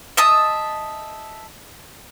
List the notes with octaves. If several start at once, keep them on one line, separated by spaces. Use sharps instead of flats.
D#5 E5 A5 D#6